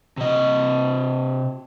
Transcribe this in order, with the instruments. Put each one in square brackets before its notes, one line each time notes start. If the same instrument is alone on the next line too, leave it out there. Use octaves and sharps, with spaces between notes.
[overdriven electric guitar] C3 D#5